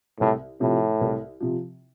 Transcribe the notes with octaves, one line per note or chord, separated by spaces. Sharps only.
C2 A2
A2 C3 F3
C2
C3 F3